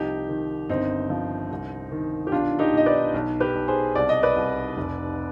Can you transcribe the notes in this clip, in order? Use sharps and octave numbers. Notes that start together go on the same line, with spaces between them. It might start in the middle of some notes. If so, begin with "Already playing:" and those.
Already playing: C2 F3 D#4 G4
D#3
G1 C4 D#4
F3
C2
D#3
G4
B1 D4 F4
D#4 G4
B1 D#5
B4 D5
B1
G4 B4
B1
G#4 C5
C2 D5
D#5
B4 D5
C2
F1